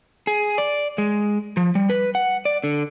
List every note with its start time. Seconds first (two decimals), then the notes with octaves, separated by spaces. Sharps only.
0.27 G#4
0.58 D5
0.98 G#3
1.57 F3
1.75 G3
1.90 B4
2.15 F#5
2.45 D5
2.64 D3